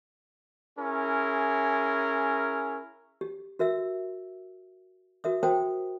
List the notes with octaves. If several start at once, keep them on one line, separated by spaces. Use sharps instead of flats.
C#4 E4 G#4 A#4
G4
F#4 A#4 E5 E6
F#4 A#4 E5 D#6
F#4 A#4 C5 G5 A5 D#6